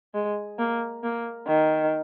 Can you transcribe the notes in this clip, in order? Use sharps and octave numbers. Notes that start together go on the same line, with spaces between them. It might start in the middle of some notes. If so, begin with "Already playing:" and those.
G#3
A#3
A#3
D#3